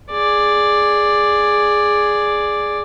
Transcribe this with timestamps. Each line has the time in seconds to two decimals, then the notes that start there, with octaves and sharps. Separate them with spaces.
0.11 G#4 D5